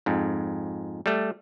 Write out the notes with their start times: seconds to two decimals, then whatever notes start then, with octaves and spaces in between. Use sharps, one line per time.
0.06 F2 G#2
1.06 G3 A3